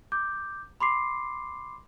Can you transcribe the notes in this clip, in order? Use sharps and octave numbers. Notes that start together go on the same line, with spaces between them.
D6 G6
B5 C6 D6 C7